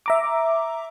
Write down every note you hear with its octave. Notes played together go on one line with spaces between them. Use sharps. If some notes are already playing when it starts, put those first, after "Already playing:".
E5 A#5 D6